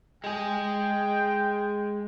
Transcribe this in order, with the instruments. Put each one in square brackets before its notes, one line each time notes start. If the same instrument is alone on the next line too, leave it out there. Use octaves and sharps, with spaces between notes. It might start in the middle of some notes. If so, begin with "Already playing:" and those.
[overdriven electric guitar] G#3 G#4 [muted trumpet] G5